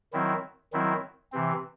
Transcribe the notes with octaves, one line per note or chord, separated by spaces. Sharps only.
D#3 F#3 C4 E4
D#3 F#3 C4 E4
C3 E3 C4